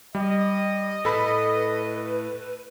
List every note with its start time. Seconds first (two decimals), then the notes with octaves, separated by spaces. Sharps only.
0.15 G3 D#5
1.05 A2 A4 B4 B5